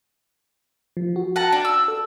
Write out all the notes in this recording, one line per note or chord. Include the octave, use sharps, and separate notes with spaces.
F3
F#4
F#5 A5 A#5
D4
E6
A4